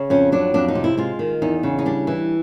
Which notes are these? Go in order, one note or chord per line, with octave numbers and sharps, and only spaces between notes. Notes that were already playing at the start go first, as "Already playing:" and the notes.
Already playing: C#3
F2 C#4
F#3 D4
F2 D4
D#4
C3
E4
G#3 F4
D#3
E2 D#4
C#3
D#4
G3 D4
E3